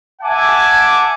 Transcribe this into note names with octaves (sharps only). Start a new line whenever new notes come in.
E5 F#5 G#5 A5 D6